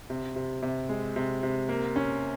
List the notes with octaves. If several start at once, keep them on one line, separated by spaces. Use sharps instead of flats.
C3
C3
C3
G#3
C3
C3
A#3
C#4